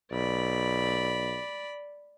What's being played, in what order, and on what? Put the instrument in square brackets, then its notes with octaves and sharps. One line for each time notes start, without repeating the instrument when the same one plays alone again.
[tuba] B1 [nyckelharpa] D5 B5